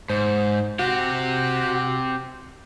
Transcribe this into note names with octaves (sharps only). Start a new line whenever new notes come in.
G#2 C5
C4 F#4 G4